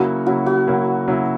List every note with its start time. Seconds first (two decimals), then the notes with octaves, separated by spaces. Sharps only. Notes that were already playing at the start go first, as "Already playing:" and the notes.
Already playing: C#3 F#3 A#3 E4 F#4
0.26 C#3 F#3 A#3 E4 F#4
0.46 F#4
0.67 C#3 F#3 A#3 E4
1.08 C#3 F#3 A#3 E4